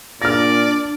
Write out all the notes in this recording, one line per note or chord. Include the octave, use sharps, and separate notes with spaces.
A#2 D4 D5 F6 A#6